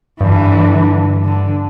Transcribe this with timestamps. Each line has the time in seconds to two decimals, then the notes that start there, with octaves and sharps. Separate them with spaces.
0.21 G2 D3 E3
1.24 D3